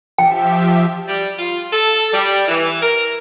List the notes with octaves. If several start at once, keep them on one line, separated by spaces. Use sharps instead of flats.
F3 G4 E5 G5
G3
F4
A4
G3
E3
A#4